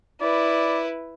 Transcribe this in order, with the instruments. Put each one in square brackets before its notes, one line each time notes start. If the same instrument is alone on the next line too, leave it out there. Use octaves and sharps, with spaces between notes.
[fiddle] E4 B4 [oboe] D5